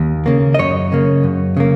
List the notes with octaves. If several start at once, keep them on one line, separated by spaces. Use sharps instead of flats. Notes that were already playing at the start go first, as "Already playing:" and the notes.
Already playing: D#2
C#3 A#3
D#5
F#2 C#5
C#3 A#3
F#2
C#3 A#3